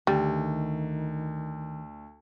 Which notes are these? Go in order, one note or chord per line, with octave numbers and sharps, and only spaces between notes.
D2 D#3 G3